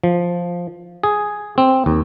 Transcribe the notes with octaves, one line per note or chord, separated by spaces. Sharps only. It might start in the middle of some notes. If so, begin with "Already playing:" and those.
F3
G#4
C4
D#2